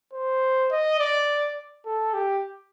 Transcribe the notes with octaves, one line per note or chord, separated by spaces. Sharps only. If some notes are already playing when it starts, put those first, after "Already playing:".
C5
D#5
D5
A4
G4